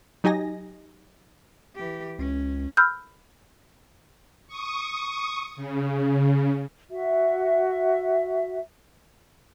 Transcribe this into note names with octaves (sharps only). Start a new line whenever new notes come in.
F#3 D#4 G4 D#5 G#5 A#6
E3 G4
C#2 C#4
B5 E6 F6 G6
C#6 D#6
C#3
F#4 E5